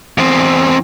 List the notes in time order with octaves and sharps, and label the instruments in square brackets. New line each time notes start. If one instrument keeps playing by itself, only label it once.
[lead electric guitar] E2 C4